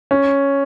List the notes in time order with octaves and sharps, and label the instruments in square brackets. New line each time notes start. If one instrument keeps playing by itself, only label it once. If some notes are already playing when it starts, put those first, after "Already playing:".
[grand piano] C#4